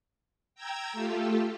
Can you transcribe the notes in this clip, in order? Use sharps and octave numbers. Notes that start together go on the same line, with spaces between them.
G5 A#5 E6 G#6
A3 F4 G4 A4